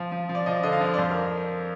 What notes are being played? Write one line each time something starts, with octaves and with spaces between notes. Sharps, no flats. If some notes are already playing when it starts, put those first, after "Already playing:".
Already playing: F3
F3
F3
D5
F3 D#5
D3 D#5
F5
F3
D5
F2 C5
A#4